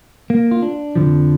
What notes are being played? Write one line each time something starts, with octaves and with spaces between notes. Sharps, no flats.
A#3
F4
D4
F2 D3 F3